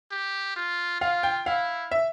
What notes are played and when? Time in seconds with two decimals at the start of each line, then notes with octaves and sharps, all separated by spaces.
0.11 G4
0.56 F4
1.01 F4 F5
1.23 G5
1.46 E4 F5
1.91 E5